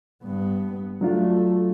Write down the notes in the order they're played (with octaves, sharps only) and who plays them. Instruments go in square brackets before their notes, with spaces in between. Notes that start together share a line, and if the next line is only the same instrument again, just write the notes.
[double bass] G2 B3
[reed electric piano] F#3 D4 F4 [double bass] A3